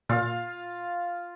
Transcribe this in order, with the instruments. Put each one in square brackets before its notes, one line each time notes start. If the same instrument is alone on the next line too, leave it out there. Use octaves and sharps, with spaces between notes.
[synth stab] A#2 [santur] F4 F5